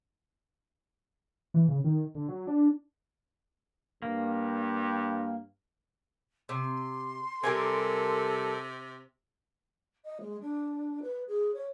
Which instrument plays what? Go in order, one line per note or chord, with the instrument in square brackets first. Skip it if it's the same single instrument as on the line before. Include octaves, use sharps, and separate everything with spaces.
[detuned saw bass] E3
C#3
D#3
D3
F#3
D4
[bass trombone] G2 [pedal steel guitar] A#3
[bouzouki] C3 [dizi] C6
[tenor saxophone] C3 [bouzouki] G3 A#4 G#5 [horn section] A4
[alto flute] D#5
G#3
D4
B4
G#4
C#5